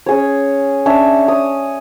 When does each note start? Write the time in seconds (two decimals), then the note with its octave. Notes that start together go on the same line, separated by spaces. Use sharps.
0.06 C#4 G#4 C#5
0.86 C#4 D4 C#5 E5
1.28 D#6